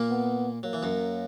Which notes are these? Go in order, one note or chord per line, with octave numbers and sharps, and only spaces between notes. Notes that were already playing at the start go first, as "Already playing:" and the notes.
Already playing: A#2 A#3
B3
F#3 A#3
E3
F#2 F#3